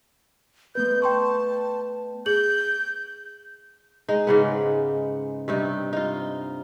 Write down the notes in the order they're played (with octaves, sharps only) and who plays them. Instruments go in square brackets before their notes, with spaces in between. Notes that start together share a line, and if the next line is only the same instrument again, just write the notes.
[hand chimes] A3 B3 B4 [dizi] G6
[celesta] G5 C6 C#6 [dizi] A5
[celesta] G#4 F#7 [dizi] G6
[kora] G#3 D#4
G#2 C#3 B3
G2 C3 D#4
D#4 F4